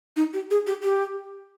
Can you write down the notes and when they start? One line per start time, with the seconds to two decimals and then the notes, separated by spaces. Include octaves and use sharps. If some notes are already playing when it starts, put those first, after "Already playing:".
0.16 D#4
0.34 G4
0.51 G#4
0.67 G4
0.83 G4